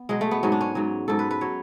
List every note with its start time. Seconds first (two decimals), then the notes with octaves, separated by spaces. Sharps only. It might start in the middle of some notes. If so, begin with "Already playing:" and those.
Already playing: B3
0.09 B2 F#3 G#3
0.21 A3
0.31 B3
0.43 G#2 F#3 C#4
0.52 D4
0.61 C#4
0.75 G#2 F#3
1.08 G#2 F#3 A4
1.19 B4
1.31 B4
1.41 F#3 C#5